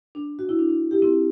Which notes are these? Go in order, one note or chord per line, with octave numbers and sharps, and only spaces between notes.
D4
F#4
E4
D4
D4
E4 G4
C4 E4